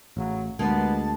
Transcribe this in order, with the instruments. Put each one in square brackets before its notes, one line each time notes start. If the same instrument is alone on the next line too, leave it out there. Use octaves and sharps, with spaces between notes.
[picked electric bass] A1 [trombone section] C#3 F#3
[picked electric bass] D2 [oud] G#3 A#3 G4 [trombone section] B3 [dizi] A5